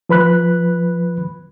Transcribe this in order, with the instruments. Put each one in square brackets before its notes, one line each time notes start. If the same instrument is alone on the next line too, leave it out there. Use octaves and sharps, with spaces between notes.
[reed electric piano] F3 B4 B5 F#6